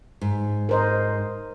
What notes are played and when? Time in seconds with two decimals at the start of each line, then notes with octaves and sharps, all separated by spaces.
0.21 G#2
0.69 A#4 C5 D#5